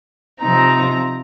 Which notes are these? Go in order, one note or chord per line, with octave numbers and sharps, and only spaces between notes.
C3 F3 C4 D#4 A#5